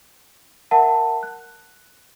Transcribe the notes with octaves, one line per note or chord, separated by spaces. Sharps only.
A#4 E5 F#5 A5
F#6